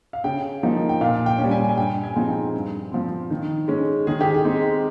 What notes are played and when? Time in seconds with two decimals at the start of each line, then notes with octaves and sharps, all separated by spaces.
0.13 F5
0.24 C#3 G5
0.63 F3 A#3 D#4
0.89 G5
1.01 A#2 F5
1.26 G5
1.38 C#4
1.44 G3
1.51 G#5
1.69 G#5
1.77 G2 G5
2.03 G#5
2.16 F3 G#3 C4 D#4 G#5
2.28 G5
2.53 G2
2.92 F3 C4
3.30 D#3
3.68 G#3 C#4
4.07 D#3 G#4
4.21 G4
4.34 G#4
4.44 G#3 C4 D#4